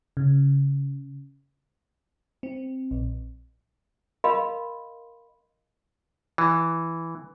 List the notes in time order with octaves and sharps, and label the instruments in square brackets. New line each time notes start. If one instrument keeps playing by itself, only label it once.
[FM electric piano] C#3
C4
A#1
[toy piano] A#4 D#5 F5 B5 C6
[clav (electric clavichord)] E3